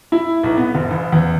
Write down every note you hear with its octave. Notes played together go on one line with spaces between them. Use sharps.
E4
B1
B3
F#1
A1
E2